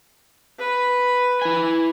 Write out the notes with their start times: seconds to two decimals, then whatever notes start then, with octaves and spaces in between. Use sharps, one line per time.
0.60 B4
1.42 E4 G#5